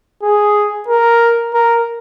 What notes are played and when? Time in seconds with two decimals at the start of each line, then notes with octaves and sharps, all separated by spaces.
0.23 G#4
0.88 A#4
1.54 A#4